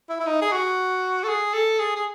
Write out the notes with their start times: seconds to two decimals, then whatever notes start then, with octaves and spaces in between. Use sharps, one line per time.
0.09 E4
0.20 E4
0.27 D#4
0.42 G#4
0.52 F#4
1.23 A4
1.28 G#4
1.53 A4
1.79 G#4
1.96 G#4